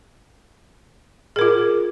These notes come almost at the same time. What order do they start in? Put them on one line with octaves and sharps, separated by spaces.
G#4 A#4 F4